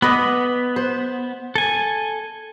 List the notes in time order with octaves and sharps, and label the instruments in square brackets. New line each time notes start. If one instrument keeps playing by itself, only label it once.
[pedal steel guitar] B3 [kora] B4 D5 D#5
[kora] C5
[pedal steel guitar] A4 G#5